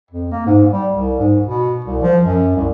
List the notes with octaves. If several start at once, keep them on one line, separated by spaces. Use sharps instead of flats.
F2
A#3
G#2
G3
C2
G#2
B2
C2
F3
F#2
C2